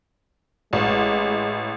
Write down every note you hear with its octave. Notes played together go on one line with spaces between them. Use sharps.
A1 G#3